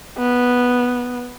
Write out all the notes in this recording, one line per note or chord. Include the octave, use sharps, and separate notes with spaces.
B3